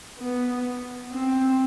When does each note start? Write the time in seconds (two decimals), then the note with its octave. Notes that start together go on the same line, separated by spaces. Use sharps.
0.20 B3
1.12 C4